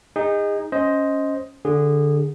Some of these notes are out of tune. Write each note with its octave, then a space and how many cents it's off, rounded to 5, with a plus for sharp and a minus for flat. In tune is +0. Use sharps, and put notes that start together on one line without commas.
D#4 +0 G#4 -35
C#4 +0 C5 +0 D#5 +10
D3 +0 G#4 -20